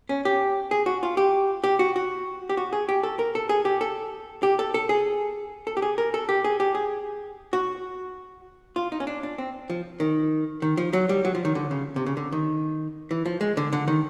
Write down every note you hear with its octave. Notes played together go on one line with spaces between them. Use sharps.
C#4
G4
G#4
F#4
F4
G4
G4
F#4
F#4
G4
F#4
G#4
G4
A4
A#4
A4
G#4
G4
A4
G4
A4
A4
G#4
A4
G4
G#4
A#4
A4
G4
G#4
G4
G#4
F#4
F4
D#4
C#4
D4
D4
C4
F3
D#3
D#3
F3
F#3
G3
F#3
F3
D#3
D3
C#3
C3
C#3
D3
D#3
E3
F3
G#3
D3
D3
D#3